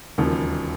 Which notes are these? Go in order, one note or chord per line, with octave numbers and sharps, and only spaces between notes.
E1 D#2 C#3 F3